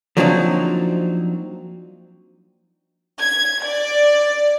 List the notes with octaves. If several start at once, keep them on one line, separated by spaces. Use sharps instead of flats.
F3 F#3 A#3 C4 D4 D#4
G#6
D5